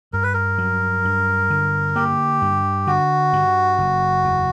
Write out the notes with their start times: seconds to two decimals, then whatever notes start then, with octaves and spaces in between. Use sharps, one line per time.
0.13 G2 A#4
0.23 B4
0.34 A#4
0.58 F#3
1.05 G2
1.50 D3
1.96 A#3 G4
2.42 G2
2.87 D3 F#4
3.33 G2
3.78 F#1
4.24 E2